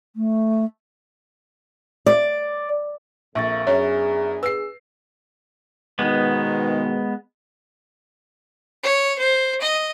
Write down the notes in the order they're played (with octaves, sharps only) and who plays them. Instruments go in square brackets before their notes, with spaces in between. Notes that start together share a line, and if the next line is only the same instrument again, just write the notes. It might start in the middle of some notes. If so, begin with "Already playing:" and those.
[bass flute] A3
[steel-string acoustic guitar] D5
[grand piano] A#1 [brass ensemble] F2 A#3 [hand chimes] E5 C#6 A6
[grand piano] F#2 [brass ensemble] B3 D4 G#4 [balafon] C#5
[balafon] B4 [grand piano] E6 C7
[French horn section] G#2 B2 D#3 [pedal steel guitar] G#3 B3
[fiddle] C#5
C5
D#5